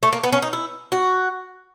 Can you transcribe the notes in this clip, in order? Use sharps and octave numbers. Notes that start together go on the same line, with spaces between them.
A3
A#3
B3
C#4
D#4
E4
F#4